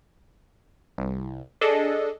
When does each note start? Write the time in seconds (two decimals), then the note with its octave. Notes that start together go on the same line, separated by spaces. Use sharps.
0.98 C2
1.61 D4 G#4 A4 D#5